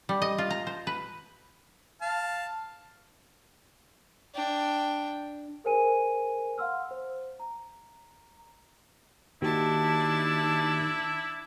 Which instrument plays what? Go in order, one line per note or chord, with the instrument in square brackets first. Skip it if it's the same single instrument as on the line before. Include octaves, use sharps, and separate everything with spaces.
[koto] G3
D#5
F4
A#5
C5
B4
[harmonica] F5 A5
[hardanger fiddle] D4 G5
[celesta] G#4 A#4 C5 G#5 D#7
F5 F#5 C6 E6 F6
C5
A#5
[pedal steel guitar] D#3 [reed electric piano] A#3 F#4 G4 [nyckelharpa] D4 A5 [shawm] E4